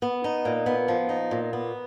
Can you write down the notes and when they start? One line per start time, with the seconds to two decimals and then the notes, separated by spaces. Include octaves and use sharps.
0.02 B3
0.24 D#4
0.45 A#2
0.66 B3
0.88 F3
1.09 D#4
1.31 A#2
1.53 B3